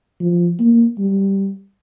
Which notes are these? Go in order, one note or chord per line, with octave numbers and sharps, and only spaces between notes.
F3
A#3
G3